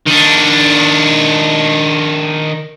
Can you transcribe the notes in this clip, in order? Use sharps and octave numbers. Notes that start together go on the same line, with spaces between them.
D#3 D4